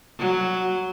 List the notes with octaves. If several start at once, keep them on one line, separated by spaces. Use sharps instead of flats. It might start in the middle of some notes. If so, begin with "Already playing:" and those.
F#3